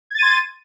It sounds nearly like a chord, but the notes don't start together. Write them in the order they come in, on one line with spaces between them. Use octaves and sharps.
G#6 A6 D#7 C6